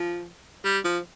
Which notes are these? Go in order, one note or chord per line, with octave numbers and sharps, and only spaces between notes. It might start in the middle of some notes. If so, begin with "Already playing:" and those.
Already playing: F3
G3
F3